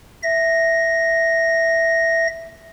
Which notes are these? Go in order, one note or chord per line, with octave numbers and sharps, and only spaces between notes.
E5 A#6